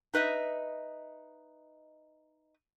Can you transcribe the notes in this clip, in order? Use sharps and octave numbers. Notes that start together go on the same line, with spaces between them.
D#4 B4 D#5 E5